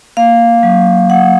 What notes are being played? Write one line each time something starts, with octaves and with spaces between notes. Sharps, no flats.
A#3 F5
F#3
F#3 F#5